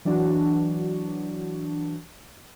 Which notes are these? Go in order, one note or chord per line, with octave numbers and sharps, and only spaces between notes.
E3 F#3 D4 F#4